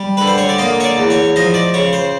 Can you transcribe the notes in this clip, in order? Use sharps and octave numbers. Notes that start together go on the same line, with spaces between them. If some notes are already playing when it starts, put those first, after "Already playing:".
Already playing: G3
D3 B4
C5
C#5
D5
A#3 D#5
C#5
D5
E2
C#5
F3 D#5
D5
C#3 C#5
C5